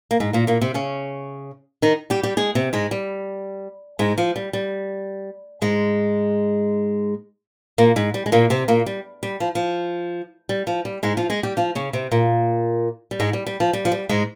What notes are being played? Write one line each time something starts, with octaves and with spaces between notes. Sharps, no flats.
A#3
G#2 G#3
A#2 A#3
A#2 A#3
C3 C4
C#3 C#4
D#3 D#4
G3 G4
G3 G4
G#3 G#4
C3 C4
G#2 G#3
G3
G#2 G#3
F3
G3
G3
G#2 G#3
A#2 A#3
G#2 G#3
G3
G#3
A#2 A#3
C3 C4
A#2 A#3
G3
G3
F3
F3
G3
F3
G3
G#2 G#3
F3 F4
G#3 G#4
G3 G4
F3 F4
C#3 C#4
C3 C4
A#2 A#3
G3
G#2 G#3
G3
G3
F3
G3
F3
G3
G#2 G#3